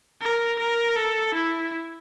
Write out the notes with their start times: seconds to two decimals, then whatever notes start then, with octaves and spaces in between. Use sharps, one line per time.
0.21 A#4
0.59 A#4
0.96 A4
1.34 E4